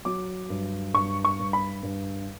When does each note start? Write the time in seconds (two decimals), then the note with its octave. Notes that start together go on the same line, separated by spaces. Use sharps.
0.05 F#3 D6
0.50 G2
0.94 G2 C#6
1.25 C#6
1.39 G2
1.53 B5
1.83 G2